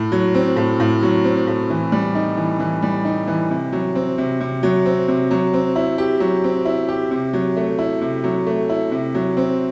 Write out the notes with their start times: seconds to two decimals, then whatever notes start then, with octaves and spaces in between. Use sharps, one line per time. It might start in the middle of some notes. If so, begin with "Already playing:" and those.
Already playing: A2
0.12 F#3
0.35 C4
0.56 A2
0.80 A2
1.03 F#3
1.24 C4
1.47 A2
1.70 E3
1.92 G3
2.15 D#4
2.37 E3
2.60 E3
2.82 G3
3.05 D#4
3.28 E3
3.50 C3
3.73 F#3
3.95 C4
4.18 C3
4.40 C3
4.63 F#3
4.86 C4
5.08 C3
5.31 F#3
5.54 C4
5.76 E4
5.98 G4
6.20 F#3
6.44 C4
6.65 E4
6.89 G4
7.11 C3
7.33 F#3
7.57 A3
7.79 E4
8.01 C3
8.24 F#3
8.46 A3
8.70 E4
8.92 C3
9.14 F#3
9.37 C4